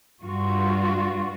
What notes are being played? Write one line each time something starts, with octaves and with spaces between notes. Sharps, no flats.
G2 F4 F#4